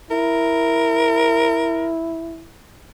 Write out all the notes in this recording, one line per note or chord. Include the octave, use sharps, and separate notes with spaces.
E4 A#4